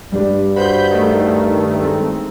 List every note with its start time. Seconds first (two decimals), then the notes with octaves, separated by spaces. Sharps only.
0.12 G2 G3 D4 G4
0.56 F#4 B4 C5 B5 G6
0.91 D#3 A3
1.82 G#3 C4 D#4